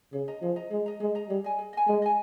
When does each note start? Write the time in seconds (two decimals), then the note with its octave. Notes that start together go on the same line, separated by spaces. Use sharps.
0.13 C#3 G#4
0.28 D#5 A#5
0.42 F3 G#4
0.56 D#5 A#5
0.71 G#3 G#4
0.86 D#5 A#5
1.00 G#3 G#4
1.15 D#5 A#5
1.29 G3 G#4
1.44 D#5 G#5
1.58 G#4
1.73 D#5 G#5
1.87 G#3 G#4
2.02 D#5 G#5